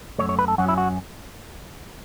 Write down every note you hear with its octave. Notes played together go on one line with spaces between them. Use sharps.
F#2 C#3 A3 C#5
C#5
B4
A4
F#2 F#3 C#4 F#4
E4
F#4